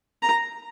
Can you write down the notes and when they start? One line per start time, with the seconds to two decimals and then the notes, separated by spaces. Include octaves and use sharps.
0.22 A#5